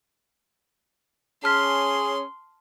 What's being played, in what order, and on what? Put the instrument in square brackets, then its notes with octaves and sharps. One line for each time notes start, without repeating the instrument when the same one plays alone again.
[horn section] C#4 G#4 [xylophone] A5 F6 B6 [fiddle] C6